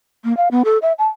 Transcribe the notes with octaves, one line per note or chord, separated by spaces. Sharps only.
A#3
F5
B3
A4
E5
A5